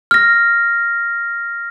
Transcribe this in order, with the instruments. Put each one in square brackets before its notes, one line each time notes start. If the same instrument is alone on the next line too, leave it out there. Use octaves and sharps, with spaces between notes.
[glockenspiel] F6 A#6